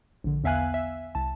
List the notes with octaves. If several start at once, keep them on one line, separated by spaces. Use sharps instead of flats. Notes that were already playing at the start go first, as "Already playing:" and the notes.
A#1 D3
E2 B3 E5 F5 G#5 F#6
E5
C2 A5